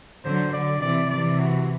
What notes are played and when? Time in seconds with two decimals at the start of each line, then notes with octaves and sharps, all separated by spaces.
0.25 D3 F#3 C5
0.53 D3 F#3 D5
0.82 C3 E3 D5
1.10 C3 E3 D5
1.39 F#4